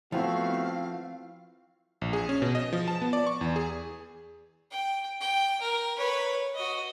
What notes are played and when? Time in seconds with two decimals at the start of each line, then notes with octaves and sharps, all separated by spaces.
0.12 F3 A3 B3 C4 E4 F#4 F5
2.01 A#1
2.13 G#4
2.29 C#4
2.42 B2
2.55 D#5
2.73 F3
2.88 A5
3.02 B3
3.13 D5
3.27 C#6
3.41 E2
3.56 G#4
4.71 G5
5.21 G5
5.61 A#4
5.96 B4 C#5
6.55 F#4 D#5